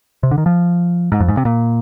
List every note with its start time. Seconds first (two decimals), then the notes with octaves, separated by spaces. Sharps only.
0.23 C3
0.31 D3
0.38 D#3
0.46 F3
1.12 G#2
1.20 F2
1.28 G#2
1.37 C3
1.45 A#2